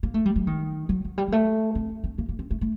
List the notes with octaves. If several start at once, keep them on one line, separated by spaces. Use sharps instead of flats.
A#3
A3
G3
F#3
D#3
F#3
F#3
G3
G3
A3
C4
C4
A#3
A#3
C4
A3
A3